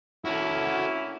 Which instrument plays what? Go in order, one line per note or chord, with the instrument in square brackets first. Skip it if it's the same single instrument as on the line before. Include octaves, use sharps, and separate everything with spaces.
[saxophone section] D2 A#3 C#4 [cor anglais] E4 [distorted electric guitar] F#4 A4